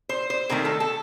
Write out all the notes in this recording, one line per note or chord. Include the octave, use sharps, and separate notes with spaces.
C5
C5
C3 D#3 A3 A#4
A4
A4